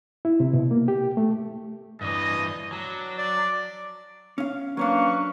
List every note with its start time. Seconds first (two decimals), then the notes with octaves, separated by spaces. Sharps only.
0.25 E4
0.40 C3
0.53 B2
0.71 A#3
0.88 G4
1.17 A3
2.01 G2 E3 D#5
2.72 F#3 D4
3.18 D5
4.38 C#4 F5
4.77 F#3 A#3 C#4 D4 B4 F5 C#6